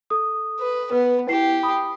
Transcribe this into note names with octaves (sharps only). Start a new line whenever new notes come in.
A4 D#6
B4
B3 B4
E4 G4 C7
B5 D#6